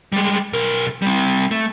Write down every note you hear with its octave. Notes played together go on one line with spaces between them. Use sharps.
G3 G#3
B1 A#4
G3 C4
A3